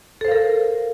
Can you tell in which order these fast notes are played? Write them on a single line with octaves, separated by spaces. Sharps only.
A4 C5 F5 A#4